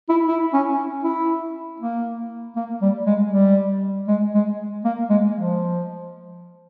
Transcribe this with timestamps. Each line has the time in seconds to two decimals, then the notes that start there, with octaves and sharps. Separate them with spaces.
0.09 E4
0.28 E4
0.53 C#4
1.04 E4
1.80 A#3
2.56 A#3
2.82 G3
3.06 G#3
3.32 G3
4.08 G#3
4.34 G#3
4.84 A#3
5.10 G#3
5.34 F3